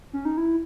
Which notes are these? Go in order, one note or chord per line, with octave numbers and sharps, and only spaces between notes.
C#4
D#4
E4